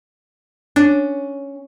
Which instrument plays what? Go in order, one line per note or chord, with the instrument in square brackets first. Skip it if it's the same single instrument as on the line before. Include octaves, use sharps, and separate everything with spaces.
[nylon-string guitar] C#4 [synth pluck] D4